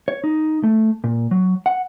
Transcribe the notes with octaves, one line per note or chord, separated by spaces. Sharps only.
C#5
D#4
A3
A#2
F#3
F#5